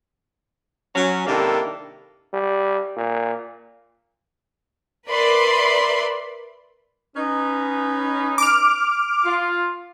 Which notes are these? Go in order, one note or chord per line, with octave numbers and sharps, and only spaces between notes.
F#3 C#4
C3 D#3 A#3 D4 E4 A4
G3
A#2
A#4 B4 D5 E5 B5 C6
C#4 D#4 B4
D6 F6
F4